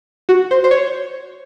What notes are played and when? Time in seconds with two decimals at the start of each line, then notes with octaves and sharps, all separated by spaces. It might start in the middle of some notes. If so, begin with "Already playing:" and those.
0.29 F#4
0.51 C5
0.64 C5
0.71 C#5